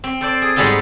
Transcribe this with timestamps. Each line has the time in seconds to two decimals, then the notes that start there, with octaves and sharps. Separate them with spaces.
0.04 C4
0.21 A4 C5 D5
0.42 G#4
0.56 G#2 G3 G#3 B3 F4 A4